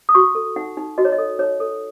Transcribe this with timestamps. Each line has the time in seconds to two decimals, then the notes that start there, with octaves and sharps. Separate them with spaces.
0.09 D#6
0.15 F#4 C#6
0.35 A4
0.56 D#4 F#5
0.77 D#4
0.98 F#4 D#5
1.05 C#5
1.12 D#5
1.18 A4
1.39 D#4 C#5
1.60 A4